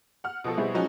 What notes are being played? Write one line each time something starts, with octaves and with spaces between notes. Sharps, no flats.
F#5 F6
B2 F3 F4 A4
B2 G3 C4 E4 G#4
F3 F#3 G#3 C#4 D#4 F#4